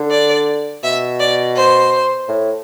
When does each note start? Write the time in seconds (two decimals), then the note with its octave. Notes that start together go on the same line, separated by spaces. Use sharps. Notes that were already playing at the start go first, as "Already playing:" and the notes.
Already playing: D3
0.11 D5
0.83 B2 E5
1.20 D5
1.56 C5
2.28 A2